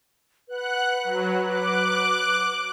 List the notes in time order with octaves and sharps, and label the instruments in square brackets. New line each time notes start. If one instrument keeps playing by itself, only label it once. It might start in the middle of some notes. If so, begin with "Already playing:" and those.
[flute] B4 [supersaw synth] F#5 F#6
[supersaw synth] F#3
D6 F#6